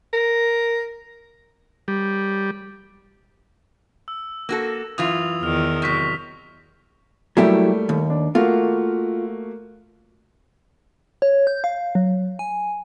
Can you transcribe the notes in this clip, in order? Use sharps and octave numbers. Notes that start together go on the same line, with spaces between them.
A#4
G3
E6
A#3 F#4 A4
F#2 E3 F4 D#6 F7
E2 D#3 F6 F7
C3 F#3 C#6 B6
F#3 G3 A3 A#3 E4 G4
D#2
D4
A3 A#3 F4 F#4
C#5
G6
F5
F#3
G#5